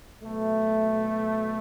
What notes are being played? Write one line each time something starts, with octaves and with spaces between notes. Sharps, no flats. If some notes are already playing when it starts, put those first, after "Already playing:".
B2 F#3 A3